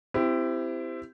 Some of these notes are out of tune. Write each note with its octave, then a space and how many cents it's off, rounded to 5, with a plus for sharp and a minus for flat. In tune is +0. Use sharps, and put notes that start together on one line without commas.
C4 -20 E4 +15 G4 +0